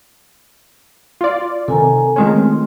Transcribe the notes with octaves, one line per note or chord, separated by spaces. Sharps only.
F4 D5
C3 D#3 A4 G#5 A#5
D#3 G#3 A3 C4 C#4 F4